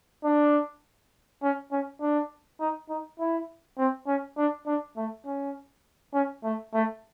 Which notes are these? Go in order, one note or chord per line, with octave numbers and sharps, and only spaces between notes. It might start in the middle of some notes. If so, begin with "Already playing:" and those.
D4
C#4
C#4
D4
D#4
D#4
E4
C4
C#4
D4
D4
A3
C#4
C#4
A3
A3